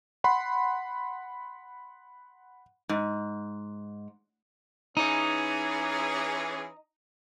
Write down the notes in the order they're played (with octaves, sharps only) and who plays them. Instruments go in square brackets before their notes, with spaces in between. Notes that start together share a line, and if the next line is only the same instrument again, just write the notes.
[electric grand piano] F#5 B5 C6
[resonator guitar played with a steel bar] G#2
[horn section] E3 C#4 G#4 [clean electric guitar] D#4